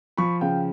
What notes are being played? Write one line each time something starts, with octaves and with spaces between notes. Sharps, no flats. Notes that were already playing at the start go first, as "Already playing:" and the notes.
F3 B5 C#6
C#3 F5 G5